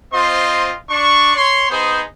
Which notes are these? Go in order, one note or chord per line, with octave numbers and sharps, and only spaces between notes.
C4 F4 C5 D#5 C6
D4 C#6
C#5 C6
B3 D#4 G#4 C5